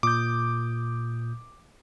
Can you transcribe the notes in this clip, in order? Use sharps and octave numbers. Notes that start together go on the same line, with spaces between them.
A#2 D6 D#6 G6